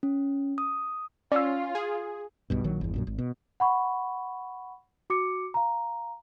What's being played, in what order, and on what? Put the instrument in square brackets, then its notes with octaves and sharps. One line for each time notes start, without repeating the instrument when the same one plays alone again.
[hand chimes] C#4
D#6
[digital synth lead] C#4 [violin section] F4 [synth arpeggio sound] D5 E6
[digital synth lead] G#4
[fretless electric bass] B1 G2 B2
A#1 D#3 F#3
G1 E2
A#1 F#2 A#2
G#1
B2
[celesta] F#5 B5 C#6
F#4 D6 C#7
F5 A#5